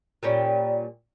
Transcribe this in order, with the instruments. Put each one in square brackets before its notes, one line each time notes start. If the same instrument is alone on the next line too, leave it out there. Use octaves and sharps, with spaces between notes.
[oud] A#2 G3 C#4